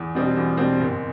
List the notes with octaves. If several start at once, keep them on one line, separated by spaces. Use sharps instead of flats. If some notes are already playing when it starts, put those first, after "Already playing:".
Already playing: E2
B2 G3 C4
E2
B2 G3 C4
F#1